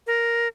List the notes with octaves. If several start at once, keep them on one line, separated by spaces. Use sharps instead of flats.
A#4